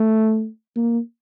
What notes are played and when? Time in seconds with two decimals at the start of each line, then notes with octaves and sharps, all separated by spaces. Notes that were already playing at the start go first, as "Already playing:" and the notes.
Already playing: A3
0.76 A#3